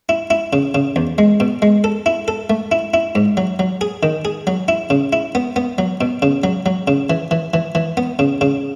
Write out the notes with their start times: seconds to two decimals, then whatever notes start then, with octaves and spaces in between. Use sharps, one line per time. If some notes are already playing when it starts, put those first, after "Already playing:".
0.09 E4
0.30 E4
0.53 C#3
0.75 C#3
0.96 E2
1.18 G#3
1.40 B2
1.62 G#3
1.84 A4
2.06 E4
2.28 A4
2.50 A3
2.72 E4
2.94 E4
3.15 G#2
3.37 F#3
3.59 F#3
3.81 G#4
4.03 D#3
4.25 G#4
4.47 F#3
4.68 E4
4.90 C#3
5.13 E4
5.35 B3
5.56 B3
5.78 F#3
6.01 B2
6.22 C#3
6.44 F#3
6.66 F#3
6.88 C#3
7.10 E3
7.31 E3
7.54 E3
7.75 E3
7.97 B3
8.19 C#3
8.41 C#3